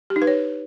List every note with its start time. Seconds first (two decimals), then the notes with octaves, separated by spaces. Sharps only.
0.10 G4
0.16 D#4
0.22 B4
0.27 C#5